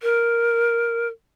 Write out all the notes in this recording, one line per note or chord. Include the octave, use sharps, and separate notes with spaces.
A#4